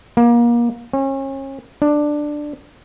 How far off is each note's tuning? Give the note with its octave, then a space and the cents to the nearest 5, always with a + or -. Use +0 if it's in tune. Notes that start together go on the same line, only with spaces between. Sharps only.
A#3 +30
C#4 -35
D4 +10